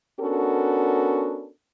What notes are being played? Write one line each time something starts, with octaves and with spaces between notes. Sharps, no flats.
B3 C#4 D4 F#4 A4 A#4